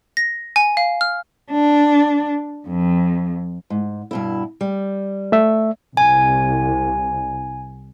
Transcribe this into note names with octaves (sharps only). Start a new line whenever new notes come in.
A#6
G#5
F5
F6
D4
F2
G#2
G2 B2 E4
G3
A3 E5
C2 G#5